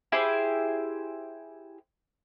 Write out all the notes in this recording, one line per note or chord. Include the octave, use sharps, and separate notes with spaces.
E4 G4 G#4 C5